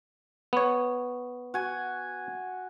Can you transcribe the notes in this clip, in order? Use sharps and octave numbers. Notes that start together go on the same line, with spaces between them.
B3 C#5
F#4 G#5